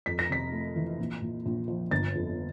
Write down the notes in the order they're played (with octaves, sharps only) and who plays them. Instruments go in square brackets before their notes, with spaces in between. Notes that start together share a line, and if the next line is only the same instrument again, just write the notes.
[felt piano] F2 B6
A#6
C3 B6
A3
E3
A#1
A#2
A#1
F3
G1 A6
F2